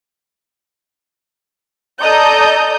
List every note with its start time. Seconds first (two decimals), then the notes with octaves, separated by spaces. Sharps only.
2.01 A4 D5 D#5 A#5 D#6 G6